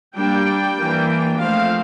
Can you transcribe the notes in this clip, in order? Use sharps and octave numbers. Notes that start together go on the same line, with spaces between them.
G3 A#3 D4 G5
E3 A#3 D4
F3 A3 C4 F5